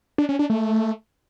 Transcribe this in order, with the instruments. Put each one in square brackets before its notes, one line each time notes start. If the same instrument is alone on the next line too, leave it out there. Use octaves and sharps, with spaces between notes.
[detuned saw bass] D4
C#4
D4
A3